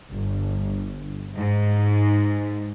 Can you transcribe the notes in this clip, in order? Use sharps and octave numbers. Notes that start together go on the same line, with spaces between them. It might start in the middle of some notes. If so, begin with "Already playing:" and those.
G1
G#2